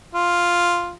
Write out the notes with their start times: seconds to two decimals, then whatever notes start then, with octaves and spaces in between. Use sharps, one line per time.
0.15 F4